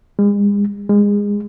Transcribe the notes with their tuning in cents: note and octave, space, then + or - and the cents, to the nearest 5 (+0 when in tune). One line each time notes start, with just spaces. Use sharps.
G#3 -40
G#3 -25